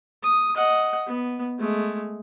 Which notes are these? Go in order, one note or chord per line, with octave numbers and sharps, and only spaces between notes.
D#6
D#5 F#5
B3
G#3 A3